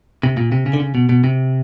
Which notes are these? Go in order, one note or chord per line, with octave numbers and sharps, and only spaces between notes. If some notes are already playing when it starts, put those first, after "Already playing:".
C3
A#2
C3
C#3
D3
C#3
B2
B2
C3